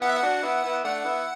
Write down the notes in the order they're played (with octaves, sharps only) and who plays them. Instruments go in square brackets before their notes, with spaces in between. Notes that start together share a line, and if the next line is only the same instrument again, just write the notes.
[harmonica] B3 E4 [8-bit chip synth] F#5
[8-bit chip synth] E5
F#5
[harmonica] D4 F#4
B3 E4
B3 E4
[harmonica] A3 D4 [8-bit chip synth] F#5
[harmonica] B3 E4